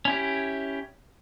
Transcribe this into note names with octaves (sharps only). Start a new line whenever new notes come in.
C#4 E4 G4